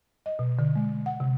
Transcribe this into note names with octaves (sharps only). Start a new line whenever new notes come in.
D#5
B2
D3
G#3
F#5
C3